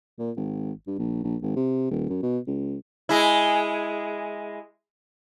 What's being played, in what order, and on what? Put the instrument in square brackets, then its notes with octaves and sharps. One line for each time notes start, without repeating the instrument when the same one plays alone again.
[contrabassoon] A#2
G#1
G2
A#1
A#1
G#1
C3
D#1
F#2
B2
C#2
[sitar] G#3 E4